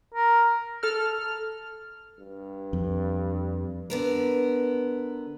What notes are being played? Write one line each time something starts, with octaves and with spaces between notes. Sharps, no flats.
A#4
A4 F6
G2
F2
D3 B3 A#4